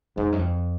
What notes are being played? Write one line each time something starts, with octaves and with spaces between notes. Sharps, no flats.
F2 G#2
F#2
F2